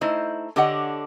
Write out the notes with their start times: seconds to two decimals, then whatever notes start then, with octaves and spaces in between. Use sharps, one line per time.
0.01 A3 D#4 E4 C5 D#5
0.56 D3 D4 G4 C#5 D#5 F#5